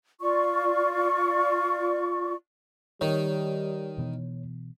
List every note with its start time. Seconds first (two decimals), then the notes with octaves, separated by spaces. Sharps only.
0.21 F4 D5 C#6
3.01 D#3 G3 C#5
3.98 B2 E3 B3